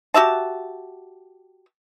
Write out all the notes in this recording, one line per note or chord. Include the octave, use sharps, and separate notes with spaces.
F#4 G4 E5 A5